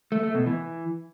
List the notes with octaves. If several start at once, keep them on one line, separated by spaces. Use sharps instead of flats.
A3
A3
B2
E3